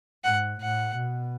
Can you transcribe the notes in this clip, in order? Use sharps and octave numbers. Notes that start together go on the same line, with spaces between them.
G#2 F#5
A2 F#5
B2